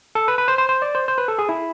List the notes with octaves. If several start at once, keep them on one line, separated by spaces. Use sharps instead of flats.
A4
B4
B4
C5
C5
C5
D5
C5
C5
B4
A4
G#4
E4